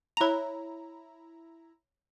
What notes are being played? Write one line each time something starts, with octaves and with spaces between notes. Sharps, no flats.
E4 C#5 A#5 F7